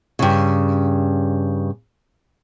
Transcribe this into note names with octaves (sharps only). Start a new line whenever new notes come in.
G2 C#3